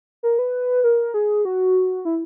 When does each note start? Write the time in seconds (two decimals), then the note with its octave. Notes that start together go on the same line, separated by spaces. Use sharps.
0.23 A#4
0.39 B4
0.84 A#4
1.14 G#4
1.45 F#4
2.05 E4